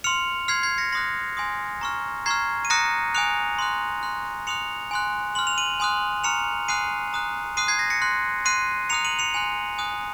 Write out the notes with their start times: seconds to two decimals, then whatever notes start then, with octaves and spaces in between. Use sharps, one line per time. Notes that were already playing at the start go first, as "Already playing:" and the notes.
0.04 C6 F6 C#7 F7
0.48 C6 F6 G#6 C7
0.63 G#6 C7
0.78 A#6 C#7
0.92 C6 D#6 F#6 A#6
1.37 G#5 C6 D#6 A#6
1.81 A#5 C#6 F6
2.26 A#5 C#6 F6 G#6 C7
2.65 D#7
2.70 A#5 D#6 F#6 A#6 C#7
3.15 G#5 D#6 F#6 C#7 F7
3.59 C6 D#6 F#6
4.03 C6 F#6
4.47 C6 D#6 F#6 C#7 F7
4.91 G#5 C6 F#6
5.35 C6 F6 F#7
5.47 F7
5.58 D#7 F#7
5.80 G#5 C6 D#6 F#6
6.24 A#5 C#6 F6 C#7 F7
6.68 G#5 C6 D#6 F#6 C7 D#7
7.13 A#5 D#6 F#6
7.57 C6 D#6 F#6 C7 D#7
7.68 G#6 C7
7.79 A#6
7.90 A#6 C#7
8.02 C6 F#6
8.45 C6 F#6 C7 D#7
8.90 A#5 D#6 F#6 C#7 F7
9.04 D#7 F#7
9.19 C#7 F7
9.34 G#5 C6 F#6 C#7 F7
9.78 G#5 D#6 F#6